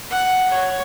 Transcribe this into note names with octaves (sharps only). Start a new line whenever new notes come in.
F#5
C#5